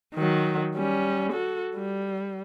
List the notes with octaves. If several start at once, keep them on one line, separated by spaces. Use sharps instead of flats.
D#3 F#3
G3 C#4
F#4 A4
G3